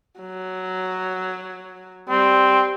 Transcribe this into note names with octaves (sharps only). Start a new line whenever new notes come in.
F#3
G3 C4